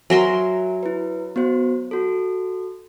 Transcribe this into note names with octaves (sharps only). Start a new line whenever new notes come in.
F#3 A#4 E5 G#5 C6
E4 B4
B3 F#4 C5
F#4 A4